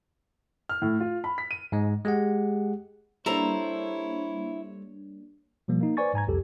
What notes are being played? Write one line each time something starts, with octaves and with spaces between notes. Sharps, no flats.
F6
A2
F4
B5
B6
D#7
G#2 G#3
G#3 G4 G#4 F#5
G3 A#3 D4 E4 A4 C5 C#5 A#5
B2 F3 G3 A#3
A#3 D#4
B4 C5 D5 G#5 C#6 A6
G#2 G#5 A#5 G#6
C2 F2 G4 A4